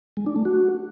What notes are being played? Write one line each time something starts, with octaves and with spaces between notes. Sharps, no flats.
G#3
D4
A3
F#4